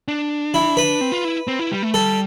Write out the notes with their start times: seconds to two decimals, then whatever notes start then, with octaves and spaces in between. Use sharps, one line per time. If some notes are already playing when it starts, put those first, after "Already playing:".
0.08 D4
0.54 E4
0.77 B4
1.01 C4
1.12 F4
1.25 E4
1.48 C4
1.59 E4
1.71 G3
1.83 A3
1.94 G3 A4